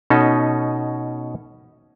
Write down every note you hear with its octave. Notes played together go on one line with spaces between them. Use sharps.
B2 C#4 D#4 A4 D#5